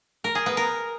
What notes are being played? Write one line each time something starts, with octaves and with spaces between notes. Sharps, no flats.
A#4
G#4
B3
A#4